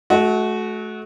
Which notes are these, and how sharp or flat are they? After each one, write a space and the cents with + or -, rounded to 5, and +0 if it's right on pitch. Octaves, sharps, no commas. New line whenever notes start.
A3 -35 F#4 -5 E5 -40